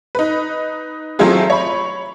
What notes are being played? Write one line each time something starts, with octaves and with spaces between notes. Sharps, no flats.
D#4 B4
F#3 A3 C4 E4 F4 G#4
C#5 B5